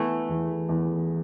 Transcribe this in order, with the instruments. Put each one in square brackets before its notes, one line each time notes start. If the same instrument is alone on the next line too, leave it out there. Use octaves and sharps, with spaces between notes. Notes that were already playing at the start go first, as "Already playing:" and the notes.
Already playing: [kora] E3 A3 [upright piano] B3
[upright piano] E2
E2